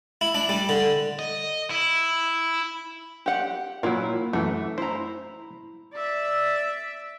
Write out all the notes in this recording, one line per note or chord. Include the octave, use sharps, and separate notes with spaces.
E4
D4
G3
D3
D#5
E4
G4 F#5
A#2 F#3 A#3 E4
F#2 E3 A3
E4 C5 A#5
D5 E5